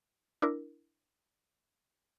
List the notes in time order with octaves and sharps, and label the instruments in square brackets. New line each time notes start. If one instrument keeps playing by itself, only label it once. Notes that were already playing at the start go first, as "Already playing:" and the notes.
[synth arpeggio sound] D4 E4 A#4